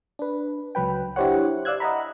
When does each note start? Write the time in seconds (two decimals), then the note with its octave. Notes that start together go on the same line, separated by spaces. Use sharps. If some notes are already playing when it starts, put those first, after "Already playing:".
0.19 D4 B4
0.75 C#2 F#3 B4 G5
1.16 D4 E4 G4 C5 C#5 F#5
1.65 D5 F5 E6 F#6 G#6
1.80 D#5 E5 F#5 A#5 B5